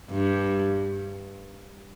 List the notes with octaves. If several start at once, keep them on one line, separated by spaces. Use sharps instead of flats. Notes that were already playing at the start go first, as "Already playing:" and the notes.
G2